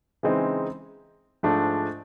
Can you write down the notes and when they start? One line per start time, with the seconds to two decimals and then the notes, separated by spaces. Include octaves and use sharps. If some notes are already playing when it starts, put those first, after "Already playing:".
0.23 C#3 E3 G#3 C4 D#4
1.43 G#2 F3 A3 D4